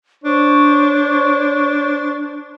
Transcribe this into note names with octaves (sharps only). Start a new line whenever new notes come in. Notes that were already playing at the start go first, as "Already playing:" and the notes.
D4 C5 C#5 C#6